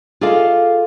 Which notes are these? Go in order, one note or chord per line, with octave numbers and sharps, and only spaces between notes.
F4 G#4 A4 D5 D#5 F5